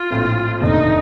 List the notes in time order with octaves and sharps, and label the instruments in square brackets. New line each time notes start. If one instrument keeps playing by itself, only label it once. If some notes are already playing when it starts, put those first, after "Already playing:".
Already playing: [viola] F4
[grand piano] A#1 A2 A3 C4
[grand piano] F1 D#2 D3 A3 D4 [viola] D#4